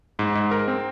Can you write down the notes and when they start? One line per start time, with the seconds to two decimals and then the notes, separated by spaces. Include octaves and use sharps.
0.19 G#2
0.35 G#2
0.51 A#4
0.68 C4